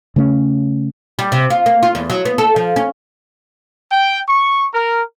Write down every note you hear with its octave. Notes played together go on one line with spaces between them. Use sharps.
C#3 A3 C4 C#4
G3
C3
F4
A#3
F4
E2
F#3
B3
A4
F3
C#4
G5
C#6
A#4